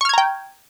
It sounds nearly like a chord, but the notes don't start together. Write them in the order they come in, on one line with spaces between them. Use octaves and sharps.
C#6 F6 G#6 A#5 G5